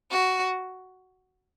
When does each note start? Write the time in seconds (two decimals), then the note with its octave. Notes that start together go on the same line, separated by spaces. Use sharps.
0.11 F#4